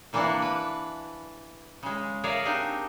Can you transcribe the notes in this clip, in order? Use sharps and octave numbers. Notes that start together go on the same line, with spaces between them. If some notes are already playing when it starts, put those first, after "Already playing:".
C3 E3 A#3 D4 D5 F#5
B4
C#3 G#3
G#4 A#4 C#5 D5 E5 F5
C4 D4 D#4 G4 A#4